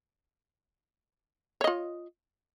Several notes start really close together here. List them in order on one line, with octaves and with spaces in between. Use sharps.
C#5 D#5 F4